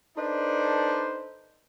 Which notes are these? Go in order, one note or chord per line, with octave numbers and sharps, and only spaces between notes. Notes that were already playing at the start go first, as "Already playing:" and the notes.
D4 D#4 A4 B4 C5 D5